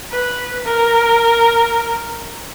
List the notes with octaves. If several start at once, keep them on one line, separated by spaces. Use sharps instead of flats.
B4
A#4